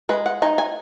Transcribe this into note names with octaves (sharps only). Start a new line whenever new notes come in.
G#3 B4
F#5
D#4 G#5
G#5